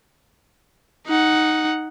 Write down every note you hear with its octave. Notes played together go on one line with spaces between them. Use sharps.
D#4 F#5